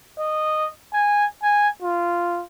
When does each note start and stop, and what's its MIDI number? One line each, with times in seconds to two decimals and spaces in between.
0.19 0.68 75
0.93 1.25 80
1.43 1.68 80
1.82 2.43 65